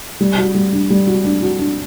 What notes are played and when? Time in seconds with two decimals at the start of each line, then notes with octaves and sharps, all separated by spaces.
0.21 G3
0.38 F#4
0.55 G3
0.73 D4
0.90 G3
1.07 F#4
1.25 D4
1.42 F#4
1.59 D4